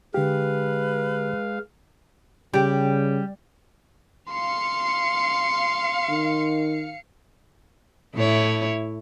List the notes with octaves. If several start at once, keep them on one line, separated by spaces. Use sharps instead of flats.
D3 G#3 G4 B4 F5
C#3 G3 G4 G5
F5 C6 C#7
D#3
A2 E4 C#5